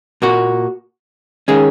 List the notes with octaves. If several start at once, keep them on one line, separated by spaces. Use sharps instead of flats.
A#2 A#3 F#4
D#3 G#3 C#4 G#4